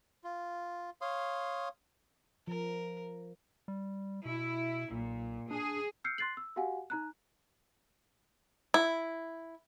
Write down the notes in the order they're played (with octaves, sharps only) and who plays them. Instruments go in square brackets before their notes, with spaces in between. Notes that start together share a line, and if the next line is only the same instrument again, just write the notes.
[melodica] F4
C#5 F5 C6 D#6
[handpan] F3 [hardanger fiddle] A#4
[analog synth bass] G3
[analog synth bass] B2 [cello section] E4
[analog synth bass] B1 [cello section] A#2
[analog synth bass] D4 [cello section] G#4
[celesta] E6 F6 G6 C7 C#7
C6 F#6 A6 C7 F#7
E6
F#4 G4 F5 F#5 G#5
D#4 A#5 F#6
[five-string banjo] E4